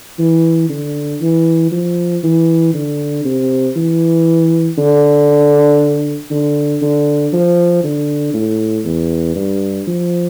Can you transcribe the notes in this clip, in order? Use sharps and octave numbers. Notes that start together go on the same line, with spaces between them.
E3
D3
E3
F3
E3
D3
C3
E3
D3
D3
D3
F3
D3
A2
E2
G2
F3